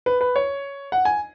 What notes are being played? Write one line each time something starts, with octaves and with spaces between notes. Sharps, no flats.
B4
B4
C#5
F#5
G#5